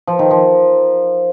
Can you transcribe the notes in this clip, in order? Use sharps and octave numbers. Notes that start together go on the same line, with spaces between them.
F3
D#3
F3